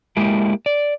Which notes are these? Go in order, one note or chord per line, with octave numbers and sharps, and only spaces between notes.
G#3 A#3 E4 G4
D5